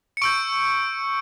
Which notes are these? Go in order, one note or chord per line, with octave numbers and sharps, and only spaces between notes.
C#7
C#6 E6 G6 D7